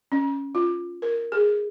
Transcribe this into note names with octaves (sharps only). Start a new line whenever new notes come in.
C#4
F4
A#4
G#4